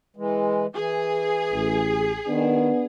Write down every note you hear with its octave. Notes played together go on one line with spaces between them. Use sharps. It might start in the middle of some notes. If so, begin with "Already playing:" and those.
E3 G#3
E3 G#4
A1
D#3 B3 D4